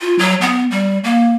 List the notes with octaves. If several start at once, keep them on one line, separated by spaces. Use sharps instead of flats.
F4
F#3
B3
G3
A#3